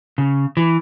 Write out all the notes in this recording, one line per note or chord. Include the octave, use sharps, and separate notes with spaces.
C#3
E3